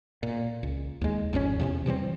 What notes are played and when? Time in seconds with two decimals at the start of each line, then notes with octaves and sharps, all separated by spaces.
0.23 A#2
0.63 C#2
1.01 D#2 G#3
1.33 G#1 F2 B2 C#4
1.59 E2 C3 C#4
1.86 C3 E3 G3 C4